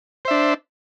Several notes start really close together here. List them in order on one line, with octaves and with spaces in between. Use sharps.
C5 E5 D4